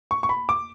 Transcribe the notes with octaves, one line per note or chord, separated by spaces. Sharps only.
C#6
C#6
B5
D6